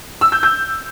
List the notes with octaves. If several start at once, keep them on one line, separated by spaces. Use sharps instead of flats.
E6
G6
G6